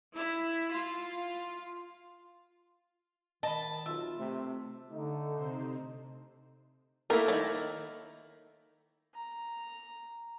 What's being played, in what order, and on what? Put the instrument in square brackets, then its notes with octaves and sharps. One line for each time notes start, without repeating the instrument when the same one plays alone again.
[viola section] E4
F4
[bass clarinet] D#3 [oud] D#5 [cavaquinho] A5 B5
[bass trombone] B1 [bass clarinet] F4 [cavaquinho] E5
[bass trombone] C3 [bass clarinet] A3
[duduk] D3 [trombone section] A3 D#4
[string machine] C3 C5
[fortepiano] A3 A#3 E4 [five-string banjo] D#4 A#4
[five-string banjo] D#3 F#3
[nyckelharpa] A#5